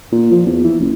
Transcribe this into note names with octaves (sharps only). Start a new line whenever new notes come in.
A#2
F3
E2
E3
F#1